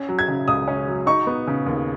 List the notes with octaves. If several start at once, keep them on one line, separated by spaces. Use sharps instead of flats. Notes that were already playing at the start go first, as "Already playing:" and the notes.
Already playing: C#4
F#3
G#6
C#3
C#2 D#6
C#4
F#3
D#4 C#6
B3
C#3
D#2